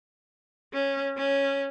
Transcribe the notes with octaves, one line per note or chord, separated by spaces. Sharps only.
C#4
C#4